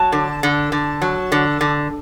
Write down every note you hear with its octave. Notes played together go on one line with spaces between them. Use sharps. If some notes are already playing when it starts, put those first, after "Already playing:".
Already playing: F#3 A5
D3
D3
D3
F#3
D3
D3